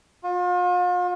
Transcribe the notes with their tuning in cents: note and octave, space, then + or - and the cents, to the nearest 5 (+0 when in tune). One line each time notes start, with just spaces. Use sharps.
F4 +40